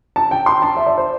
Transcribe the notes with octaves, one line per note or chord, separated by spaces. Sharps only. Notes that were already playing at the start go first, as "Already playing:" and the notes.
A5
G5
C6
A5
E5
D5
C5